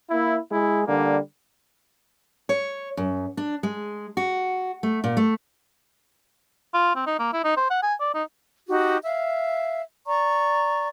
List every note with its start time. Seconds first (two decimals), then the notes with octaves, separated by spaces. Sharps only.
0.10 A#3 E4
0.51 G#3 E4
0.87 D3 G3 A#3
2.49 C#5
2.97 F#2
3.37 D4
3.63 G#3
4.17 F#4
4.83 A3
5.04 A#2
5.17 A3
6.74 F4
6.95 C4
7.07 D#4
7.19 A#3
7.33 E4
7.45 D#4
7.57 C5
7.70 F#5
7.83 G#5
8.01 D5
8.15 D#4
8.68 D#4 F#4 G4
9.04 E5 F5
10.07 D5 A#5 C#6